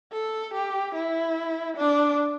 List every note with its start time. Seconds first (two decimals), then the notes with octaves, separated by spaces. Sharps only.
0.13 A4
0.54 G4
0.95 E4
1.77 D4